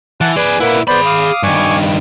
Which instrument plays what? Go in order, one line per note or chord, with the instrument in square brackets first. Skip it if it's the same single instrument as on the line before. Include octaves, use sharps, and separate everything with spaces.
[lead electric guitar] E3 [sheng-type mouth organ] F#5 A5 F#6
[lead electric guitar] G#4 D5 [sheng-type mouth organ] B4 G#5
[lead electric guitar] A#2 E4 [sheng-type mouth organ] A#3 B4 F#5
[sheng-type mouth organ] B3 C5 D5 [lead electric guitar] G#4 B5
[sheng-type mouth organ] F5 D6 D#6
[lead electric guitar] G2 D#3 [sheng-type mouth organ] G#5 C#6 D6